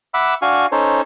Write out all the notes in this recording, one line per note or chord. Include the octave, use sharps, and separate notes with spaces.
E5 F#5 B5 D6 E6
D4 F#4 F5 G#5 C#6
C#4 D#4 A4 C5 C#5